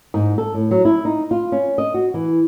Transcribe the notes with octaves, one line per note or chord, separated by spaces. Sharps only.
G#2
A4
A2
F#3
E4
D#4
F4
C#4
D#5
F#4
E3